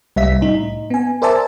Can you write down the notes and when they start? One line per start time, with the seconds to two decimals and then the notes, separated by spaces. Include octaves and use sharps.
0.16 C2 G3 E5 B6
0.41 A2 D#4
0.90 B3 G#5
1.22 A#4 C5 D5 E5 G#5 A5